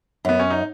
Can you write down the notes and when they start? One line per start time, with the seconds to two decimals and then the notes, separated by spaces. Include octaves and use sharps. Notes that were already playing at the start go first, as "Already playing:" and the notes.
0.25 F#2 B3
0.40 C#4
0.50 D#4